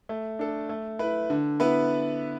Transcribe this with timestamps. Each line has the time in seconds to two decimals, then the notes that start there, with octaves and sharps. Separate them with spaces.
0.09 A3
0.39 D4 A4
0.69 A3
0.99 E4 B4
1.30 D3
1.60 B3 E4 B4